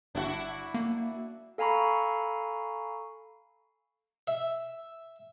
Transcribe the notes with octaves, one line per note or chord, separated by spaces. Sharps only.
G1 D4 E4 F#4
A#3
A4 F5 G#5 A#5 B5 C#6
E5